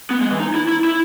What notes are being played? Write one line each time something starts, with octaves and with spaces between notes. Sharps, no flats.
B3
G#3
E3
D#4
E4
E4
E4